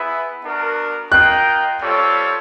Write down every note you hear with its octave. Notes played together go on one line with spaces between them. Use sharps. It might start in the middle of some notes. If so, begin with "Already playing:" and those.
Already playing: B3 E4 G#4 B4 E5
B3 D4 F#4 A#4
F4 A#4 D#5 G5 F#6
G3 C4 F4 A4 C#5